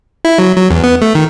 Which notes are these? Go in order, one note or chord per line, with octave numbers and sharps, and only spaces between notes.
E4
F#3
F#3
E2
B3
A3
D#3